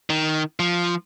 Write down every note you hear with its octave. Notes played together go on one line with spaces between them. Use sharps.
D#3
F3